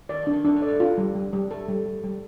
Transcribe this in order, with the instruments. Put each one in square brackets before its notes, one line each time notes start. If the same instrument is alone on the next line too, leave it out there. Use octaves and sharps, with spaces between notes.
[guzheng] D#3 [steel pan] D5
[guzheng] F3 [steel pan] D4
[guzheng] D#3
[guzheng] D3 [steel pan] D4
[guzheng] A2
[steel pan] D5
[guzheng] G2
[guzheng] G2 [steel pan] F4
[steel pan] G3
G3
G3
[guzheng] A2 [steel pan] A4
[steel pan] G3
G3
G3